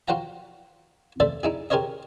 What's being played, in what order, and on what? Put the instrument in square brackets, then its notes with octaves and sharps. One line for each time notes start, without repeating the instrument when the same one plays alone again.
[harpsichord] F4 F#4 C5 F#5 G5 A#5
A3 A4 C5 D5 E5
D#4 E4 G#4
G4 G#4 A#4 C5 C#5 D#5